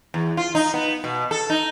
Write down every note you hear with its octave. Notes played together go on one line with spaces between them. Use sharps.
E2
F4
D#4
B3
B2
A4
D#4